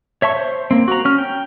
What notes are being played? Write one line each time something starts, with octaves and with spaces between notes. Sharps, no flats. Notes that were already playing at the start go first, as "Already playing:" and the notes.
C#5 E5 A5 C#6
C5
A#3 C4
F#4 A#5
C#4 F6
G5